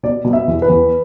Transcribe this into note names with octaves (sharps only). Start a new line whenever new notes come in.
B2 D5
B2
E5
E2
B4
E2